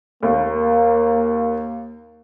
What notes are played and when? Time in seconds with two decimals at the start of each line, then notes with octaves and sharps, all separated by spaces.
0.23 D#2 A#3